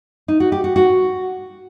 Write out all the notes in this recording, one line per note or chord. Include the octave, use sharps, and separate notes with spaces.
D#4
F#4
G4
F#4
F#4